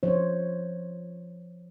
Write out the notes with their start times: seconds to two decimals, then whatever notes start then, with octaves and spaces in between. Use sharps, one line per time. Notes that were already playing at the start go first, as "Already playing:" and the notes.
0.03 F3 C5 C#5